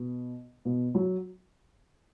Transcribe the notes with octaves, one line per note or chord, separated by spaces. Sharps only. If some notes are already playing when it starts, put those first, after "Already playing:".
Already playing: B2
B2
F#3